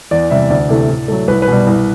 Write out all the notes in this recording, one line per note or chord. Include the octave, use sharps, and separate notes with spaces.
E2 D5
C3 E3 G3 E5
D2 D5
C3 E3 A3
A2
F#3 A3
C2 B4
B4
B2 G3
C2